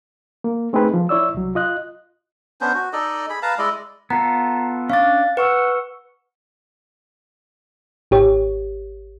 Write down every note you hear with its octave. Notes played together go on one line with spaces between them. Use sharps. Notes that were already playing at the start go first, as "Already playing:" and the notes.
A#3
A3 C4 D#4 G#4 B4
F3
E4 C#5 D5 E6
C2 F#3
F4 D#5 F#6
B3 C#4 D4 C5
F#4
D#4 A4 D5 D#5
G#4 B5
B4 F5 A5 A#5
G#3 E4 D5 D#5
B3 F4 A4 A#5
C#4 D4 F5 D6 A6
B4 F#5 C#6 E6
G#1 G4 C#5